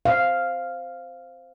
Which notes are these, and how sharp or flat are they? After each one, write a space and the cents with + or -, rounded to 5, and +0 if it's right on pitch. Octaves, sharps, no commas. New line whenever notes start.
C5 +0 F5 +0